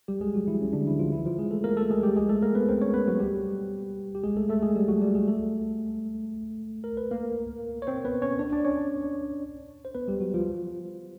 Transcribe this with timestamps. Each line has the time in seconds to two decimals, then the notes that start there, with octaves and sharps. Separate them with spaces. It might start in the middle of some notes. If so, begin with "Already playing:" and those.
0.08 G3 G4
0.21 G#3 G#4
0.34 F#3 F#4
0.47 E3 E4
0.61 C#4
0.73 D3 D4
0.87 E3 E4
0.99 F3 F4
1.12 E3 E4
1.25 F3 F4
1.39 G#3 G#4
1.51 A3 A4
1.64 A#3 A#4
1.77 A3 A4
1.90 G#3 G#4
2.03 G3 G4
2.16 G#3 G#4
2.29 A3 A4
2.42 A#3 A#4
2.55 B3 B4
2.69 C4 C5
2.81 C#4 C#5
2.94 B3 B4
3.08 F#3 F#4
3.20 G3 G4
4.15 G4
4.23 G#3 G#4
4.37 A3 A4
4.49 A3 A4
4.62 G#3 G#4
4.76 G3 G4
4.88 F#3 F#4
5.01 G3 G4
5.15 G#3 G#4
5.28 A3 A4
6.84 A#4
6.97 B4
7.11 A#3 A#4
7.82 C#5
7.87 C4 C5
8.05 B3 B4
8.22 C#4 C#5
8.39 D4 D5
8.52 D4 D5
8.65 C#4 C#5
9.85 C5
9.95 B3 B4
10.08 G3 G4
10.20 F#3 F#4
10.34 F3 F4